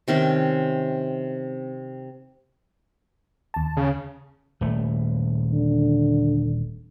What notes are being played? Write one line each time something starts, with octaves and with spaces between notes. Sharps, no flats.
C3 D#3 C4 C#4
D#2 A5
C#3
D#1 A3
D3